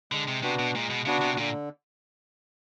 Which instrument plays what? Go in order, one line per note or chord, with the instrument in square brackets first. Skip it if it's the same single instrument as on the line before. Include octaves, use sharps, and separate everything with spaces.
[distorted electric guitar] D3 [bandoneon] G#3
[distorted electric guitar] C3
[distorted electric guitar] C3 [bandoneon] B3 D4 F#4 B4
[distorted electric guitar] B2
[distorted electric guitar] A#2 [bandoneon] G#3
[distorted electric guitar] B2
[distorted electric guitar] C#3 [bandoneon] B3 D4 F#4 B4
[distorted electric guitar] C3
[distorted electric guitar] A#2 [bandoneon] D3